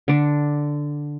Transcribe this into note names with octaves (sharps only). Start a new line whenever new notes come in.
D3 D4